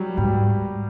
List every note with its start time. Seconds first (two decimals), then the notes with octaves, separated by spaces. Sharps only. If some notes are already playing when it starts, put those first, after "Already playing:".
Already playing: F#3 G3
0.17 G#2 G3